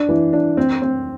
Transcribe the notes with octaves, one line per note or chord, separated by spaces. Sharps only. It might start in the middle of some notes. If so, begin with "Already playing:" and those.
Already playing: D4
E3
D4
C4
C4